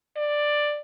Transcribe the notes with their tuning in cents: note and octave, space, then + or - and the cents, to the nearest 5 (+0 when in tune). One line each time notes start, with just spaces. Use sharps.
D5 +10